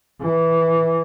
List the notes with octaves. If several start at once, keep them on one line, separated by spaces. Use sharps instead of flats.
E3